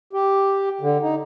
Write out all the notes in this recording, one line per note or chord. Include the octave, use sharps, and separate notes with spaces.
G4
D3
D#4